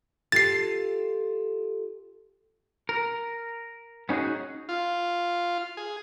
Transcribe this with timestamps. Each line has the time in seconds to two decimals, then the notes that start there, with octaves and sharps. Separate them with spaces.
0.32 F4 G4 A4 A6 C7
2.89 A#4
4.09 B3 C#4 D#4 F#4 G#4
4.69 F4
5.77 G#4